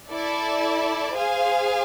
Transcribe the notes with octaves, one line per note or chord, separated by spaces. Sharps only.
E4 A4 D5
G#4 C5 F5 G#5